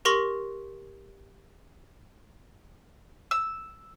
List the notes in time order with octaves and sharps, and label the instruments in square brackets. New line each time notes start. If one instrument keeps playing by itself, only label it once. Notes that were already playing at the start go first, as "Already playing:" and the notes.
[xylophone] G4 A#4 C6 C#6 A#6 F#7
[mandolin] E6